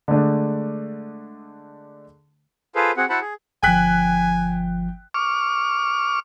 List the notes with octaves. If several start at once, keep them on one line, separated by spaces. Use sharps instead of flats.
D3 G#3 A3 D4
F4 G#4 A4 B4 C5 F5
C4 F#4 G#4 F#5
E4 F#4 C5 F#5 A5 B5
G#4
G1 F3 G5 G#5 F#6 B6
C#6 D6 F6